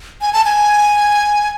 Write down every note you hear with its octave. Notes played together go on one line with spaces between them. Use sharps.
G#5
A5
G#5